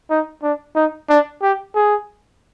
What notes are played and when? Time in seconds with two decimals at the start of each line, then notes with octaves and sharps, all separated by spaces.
0.10 D#4
0.43 D4
0.76 D#4
1.09 D4
1.42 G4
1.75 G#4